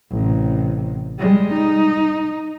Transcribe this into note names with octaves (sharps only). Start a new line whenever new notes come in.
A1 C3
G3 G#3
D#4